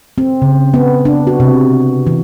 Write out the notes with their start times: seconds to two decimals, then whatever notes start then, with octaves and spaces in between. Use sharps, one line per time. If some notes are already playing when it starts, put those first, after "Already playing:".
0.18 C4
0.42 C#3
0.74 B3
1.05 D4
1.27 F#4
1.40 C3
2.07 E3